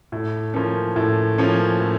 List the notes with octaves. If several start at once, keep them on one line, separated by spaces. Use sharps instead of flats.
A2
F3 A#3 C#4
A2
F3 A#3 C#4
A2